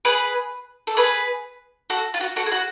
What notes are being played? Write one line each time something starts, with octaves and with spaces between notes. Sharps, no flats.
G#4 B4
A4
G#4 B4
F#4 A4
F4
F#4
F#4 A4
G#4
F#4